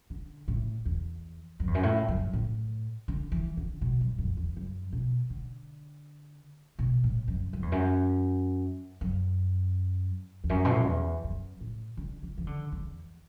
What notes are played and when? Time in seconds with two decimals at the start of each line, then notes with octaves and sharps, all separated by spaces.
0.10 D3
0.48 A2
0.85 E2
1.60 F#2
1.67 E2
1.75 F#2
1.83 A2
2.08 F#2
2.33 A2
3.08 D3
3.32 E3
3.57 D3
3.81 B2
4.01 F#2
4.18 F#2
4.37 E2
4.56 F#2
4.92 B2
5.30 D3
6.79 B2
7.04 A2
7.28 F#2
7.53 F#2
7.62 E2
7.72 F#2
9.01 F#2
10.44 E2
10.50 F#2
10.65 B2
10.71 A2
10.79 F#2
10.87 E2
11.24 F#2
11.61 A2
11.97 D3
12.23 E3
12.38 E3
12.47 D3
12.72 E2